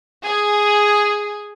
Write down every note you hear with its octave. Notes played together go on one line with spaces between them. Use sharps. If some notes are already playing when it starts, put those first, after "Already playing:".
G#4